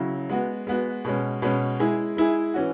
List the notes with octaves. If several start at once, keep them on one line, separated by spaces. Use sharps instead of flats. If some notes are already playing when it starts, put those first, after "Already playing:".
Already playing: C#3 F#3 E4
G#3 B3 F#4
G#3 B3 F#4
B2 G#3 C#4
B2 G#3 C#4
G#3 E4 G#4
G#3 E4 G#4
E3 C#4 F#4